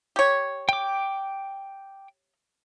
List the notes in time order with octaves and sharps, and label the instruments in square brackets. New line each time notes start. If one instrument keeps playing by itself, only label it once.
[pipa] G4 C#5
[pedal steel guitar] G5 D6